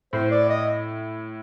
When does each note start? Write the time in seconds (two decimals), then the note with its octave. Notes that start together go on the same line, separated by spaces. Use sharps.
0.13 A2 C5
0.31 D5
0.49 D#5